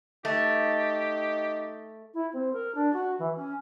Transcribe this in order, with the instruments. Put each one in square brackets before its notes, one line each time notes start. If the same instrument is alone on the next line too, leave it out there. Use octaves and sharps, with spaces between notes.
[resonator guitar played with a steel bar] A3 [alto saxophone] D#4 [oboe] G4
[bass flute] E4
C4
A#4
D4
F#4
E3
C#4